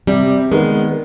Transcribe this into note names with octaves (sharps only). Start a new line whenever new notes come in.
C3 G3
D#3 G#3 B3